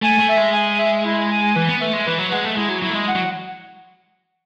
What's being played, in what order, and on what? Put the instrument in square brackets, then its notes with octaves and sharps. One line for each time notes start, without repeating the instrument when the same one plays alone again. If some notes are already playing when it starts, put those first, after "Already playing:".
[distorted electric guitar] A3 [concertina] G#5
[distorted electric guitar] A3
[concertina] E5
[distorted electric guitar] G#3
[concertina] G#5
E5
E4
G#5
[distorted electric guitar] E3 [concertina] B4
[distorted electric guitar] B3
[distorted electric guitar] A3 [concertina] E5
[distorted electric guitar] G#3
[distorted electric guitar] E3 [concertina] B4
[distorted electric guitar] F#3
[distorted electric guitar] G#3 [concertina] F#5
[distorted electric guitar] A3
[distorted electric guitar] G#3 [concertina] E4
[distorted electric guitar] F#3
[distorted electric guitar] F#3 [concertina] E4
[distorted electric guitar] A3
G#3
[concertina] F#5
[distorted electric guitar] F#3